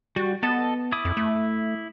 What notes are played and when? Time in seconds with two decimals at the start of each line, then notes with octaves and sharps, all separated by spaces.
0.16 G3 F#4
0.43 B3 A4 D#5 A5
0.92 E4 D6 D#6
1.05 F2
1.17 A3